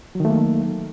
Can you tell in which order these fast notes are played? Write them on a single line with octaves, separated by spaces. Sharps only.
F#3 D#3 A3 A#3